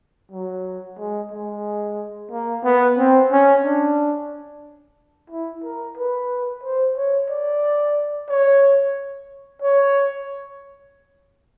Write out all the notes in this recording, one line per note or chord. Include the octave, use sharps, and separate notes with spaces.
F#3
G#3
G#3
A#3
B3
C4
C#4
D4
E4
A#4
B4
C5
C#5
D5
C#5
C#5